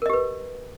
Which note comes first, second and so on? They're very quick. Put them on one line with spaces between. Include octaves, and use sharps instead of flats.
A#4 D#5 G4 B4